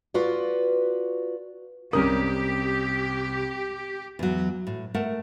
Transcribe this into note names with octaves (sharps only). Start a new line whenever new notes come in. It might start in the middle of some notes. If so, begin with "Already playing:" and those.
F4 F#4 B4 D5
C2 C3 C#4 G4 A#4 D#6
E2 F#3
A2
A3 A#4 F#5 A5